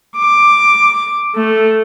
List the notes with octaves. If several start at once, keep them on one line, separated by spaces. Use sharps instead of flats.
D6
A3